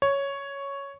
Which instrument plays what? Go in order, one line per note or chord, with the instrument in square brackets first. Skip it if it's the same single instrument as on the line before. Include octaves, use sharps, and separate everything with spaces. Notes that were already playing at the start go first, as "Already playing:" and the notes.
[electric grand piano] C#5